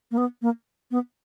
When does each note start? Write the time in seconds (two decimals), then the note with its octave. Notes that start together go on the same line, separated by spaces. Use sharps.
0.11 A#3
0.18 B3
0.42 A#3
0.91 B3